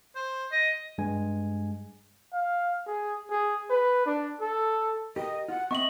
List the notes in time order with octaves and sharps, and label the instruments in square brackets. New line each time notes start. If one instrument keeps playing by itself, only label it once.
[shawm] C5
D#5
[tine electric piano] G2 G#3 G#5
[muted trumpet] F5
G#4
G#4
B4
D4
A4
[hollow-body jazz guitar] G4 A#4 [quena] D#5
[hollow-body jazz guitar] F4 [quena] F#5
[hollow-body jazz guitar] C4 E5 [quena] D#5 [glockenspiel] C#6 F#7